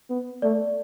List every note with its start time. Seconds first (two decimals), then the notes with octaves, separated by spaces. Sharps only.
0.10 B3
0.42 A3 D5